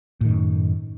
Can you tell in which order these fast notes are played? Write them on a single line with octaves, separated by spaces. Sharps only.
A2 D#3 F#2